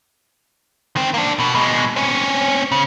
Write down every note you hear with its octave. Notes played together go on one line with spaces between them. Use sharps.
D#3 C4
A#3 D4
B2
B2 G#3
C4 C#4
C#3